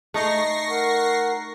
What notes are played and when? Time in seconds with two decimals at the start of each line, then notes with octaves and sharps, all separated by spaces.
0.14 A3 D#4 C#6 A#6 C7
0.70 A#4 F#5